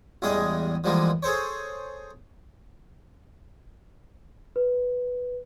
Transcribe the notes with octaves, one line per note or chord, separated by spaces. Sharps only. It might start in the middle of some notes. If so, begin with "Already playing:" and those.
A1 E2 G3 G#3 G#4 D#5
D3 E3 F3 G3 G#3 A#3
G#4 A4 C5 C#5
B4